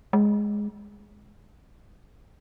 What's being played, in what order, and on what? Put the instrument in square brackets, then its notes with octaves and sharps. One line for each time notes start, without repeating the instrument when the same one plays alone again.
[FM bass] G#3